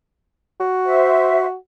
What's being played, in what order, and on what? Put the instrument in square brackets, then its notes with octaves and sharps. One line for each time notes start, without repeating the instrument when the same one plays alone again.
[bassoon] F#4
[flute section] C5 E5